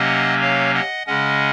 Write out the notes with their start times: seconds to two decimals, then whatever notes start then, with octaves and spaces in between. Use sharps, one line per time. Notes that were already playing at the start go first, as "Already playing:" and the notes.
Already playing: C3 F#3 A#3 C#4 D#5 F#5
0.41 C#5 F5
0.74 D#5 F#5
1.07 C#3 G#3 C#4 D#5 F#5